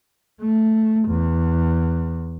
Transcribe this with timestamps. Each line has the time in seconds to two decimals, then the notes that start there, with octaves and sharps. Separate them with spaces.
0.42 A3
1.08 E2